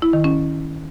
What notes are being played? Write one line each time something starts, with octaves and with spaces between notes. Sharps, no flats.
E4
D#3
C#4